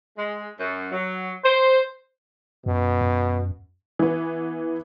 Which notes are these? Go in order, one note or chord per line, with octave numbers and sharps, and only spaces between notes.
G#3
F#2
F#3
C5
F#2 B2
F#2
E3 B3